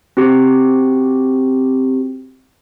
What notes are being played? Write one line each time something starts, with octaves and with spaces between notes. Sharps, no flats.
C4 F#4 G4